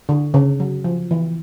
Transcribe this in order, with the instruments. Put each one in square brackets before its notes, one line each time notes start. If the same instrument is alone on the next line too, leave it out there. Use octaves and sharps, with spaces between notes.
[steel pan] D3
C#3
F#3
F3
E3